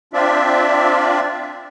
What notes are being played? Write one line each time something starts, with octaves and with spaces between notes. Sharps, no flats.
C4 D4 F4 D5 E5